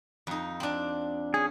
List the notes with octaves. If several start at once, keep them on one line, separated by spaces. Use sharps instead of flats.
F2 D#4
C4 D4
C#4 G#4